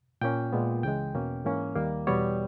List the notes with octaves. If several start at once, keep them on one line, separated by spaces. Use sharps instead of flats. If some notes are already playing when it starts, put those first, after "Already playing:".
A#2 A#3 C#4 G5
A#2 G#3 B3
C#2 C#3 E3 G#3 G5
E2 B2 A#3 C#4
G#2 E3 A#3 C#4
D#2 D#3 G3 A#3
E2 B2 G3 B3 C#5